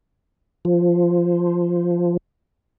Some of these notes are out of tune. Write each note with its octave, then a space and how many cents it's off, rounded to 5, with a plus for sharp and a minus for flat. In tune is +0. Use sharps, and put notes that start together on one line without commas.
F3 -5